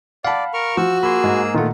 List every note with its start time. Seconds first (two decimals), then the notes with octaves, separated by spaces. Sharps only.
0.25 D5 F5 F#5 A5 B5
0.54 A#4 C#6 F6
0.77 F3 F#4 C#6 E6
1.03 A#3 G#4 B5 C6 E6
1.24 G#2
1.54 A#2 D#3 A3 F4 F#5